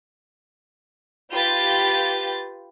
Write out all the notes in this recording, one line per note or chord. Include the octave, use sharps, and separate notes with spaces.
F4 G4 B4 G6 A6